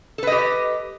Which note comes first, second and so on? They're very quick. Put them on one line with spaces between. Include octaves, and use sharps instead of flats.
A4 B4 D#5 G4